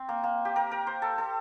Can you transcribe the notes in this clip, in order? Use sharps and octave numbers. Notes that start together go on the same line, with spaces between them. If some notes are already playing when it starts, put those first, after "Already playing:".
Already playing: C4
A#3
A#3
G4
A#4
A#4
C5
A4
A4